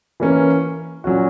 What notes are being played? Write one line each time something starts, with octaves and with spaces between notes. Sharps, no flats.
E3 A#3 C#4
A#2 F#3 C#4 F#4